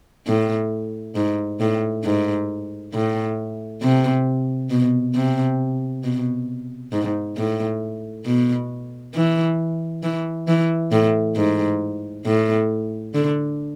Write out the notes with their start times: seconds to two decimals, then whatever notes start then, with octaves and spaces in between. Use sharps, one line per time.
0.27 A2
1.15 G#2
1.60 A2
2.04 G#2
2.94 A2
3.82 C3
4.70 B2
5.15 C3
6.04 B2
6.92 G#2
7.37 A2
8.25 B2
9.15 E3
10.03 E3
10.48 E3
10.92 A2
11.36 G#2
12.26 A2
13.14 D3